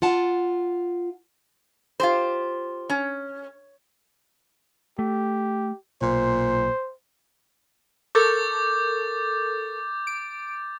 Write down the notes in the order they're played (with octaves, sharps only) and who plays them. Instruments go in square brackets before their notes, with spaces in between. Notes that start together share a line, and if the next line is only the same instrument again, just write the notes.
[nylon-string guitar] F4 F#5 A5
[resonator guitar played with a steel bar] F4 G4 C5
C#4
[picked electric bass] A3 [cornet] G4
[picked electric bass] B1 [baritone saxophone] A#2 [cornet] C5
[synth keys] A4 A#4 C#6 [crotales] D6 G6 A6
[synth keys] D7